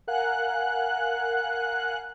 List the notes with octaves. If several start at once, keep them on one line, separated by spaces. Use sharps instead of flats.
A#4 F5 F#5 G#5 F#6